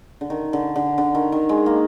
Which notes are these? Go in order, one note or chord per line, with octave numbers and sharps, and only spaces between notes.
D3
D#3
D3
D3
D3
D#3
D#3
G#3
A#3